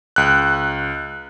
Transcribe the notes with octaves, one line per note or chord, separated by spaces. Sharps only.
C#2 F#6